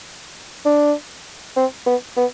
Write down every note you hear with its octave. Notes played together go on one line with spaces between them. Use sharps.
D4
C4
B3
B3